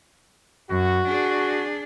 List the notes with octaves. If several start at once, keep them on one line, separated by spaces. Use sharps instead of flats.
F#2 F#4
D4 G#4